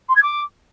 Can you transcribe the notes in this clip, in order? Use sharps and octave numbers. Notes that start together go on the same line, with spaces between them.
C6
G#6
D6